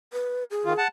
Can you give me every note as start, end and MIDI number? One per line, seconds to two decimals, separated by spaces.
0.13 0.44 71
0.51 0.80 68
0.65 0.73 51
0.65 0.73 65
0.78 0.88 78
0.78 0.88 81